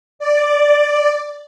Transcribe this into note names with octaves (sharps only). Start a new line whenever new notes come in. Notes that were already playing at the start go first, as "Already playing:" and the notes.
D5